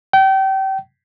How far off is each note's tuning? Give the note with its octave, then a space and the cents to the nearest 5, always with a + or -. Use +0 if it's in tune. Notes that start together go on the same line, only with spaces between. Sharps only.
G5 -30